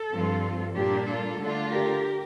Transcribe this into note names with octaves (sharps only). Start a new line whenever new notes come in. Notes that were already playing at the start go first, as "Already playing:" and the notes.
Already playing: A4
G2 F3 C4 F4
A#2 G3 A#3 D4 G4
F4 A4
D3 A3 D4 F4
G4 A#4